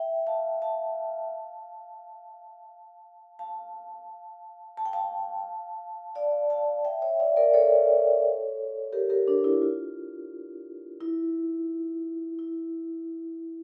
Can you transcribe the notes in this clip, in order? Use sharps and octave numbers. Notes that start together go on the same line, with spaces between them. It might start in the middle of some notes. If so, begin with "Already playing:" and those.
Already playing: E5 G5
F5 A5
F5 A5
F5 A5
A5
G5
F5 A5
D5 F5
F5 A5
E5 G5
C#5 E5
D5 F5
A#4 D5
A4 C#5
G4 A#4
G4 A#4
D4
E4
F4
E4
E4